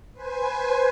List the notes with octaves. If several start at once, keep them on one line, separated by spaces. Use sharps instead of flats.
B4 C5 G#5